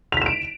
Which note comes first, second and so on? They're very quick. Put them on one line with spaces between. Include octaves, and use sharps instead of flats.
F7 B6 E7 D7